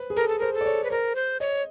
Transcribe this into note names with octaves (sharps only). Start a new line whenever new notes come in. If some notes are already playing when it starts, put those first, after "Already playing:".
Already playing: B4 C5
G#4
A4 A#4
A4
A#4 C5
A4
D5
C#5
B4
A#4 C5
C5
C#5 D#5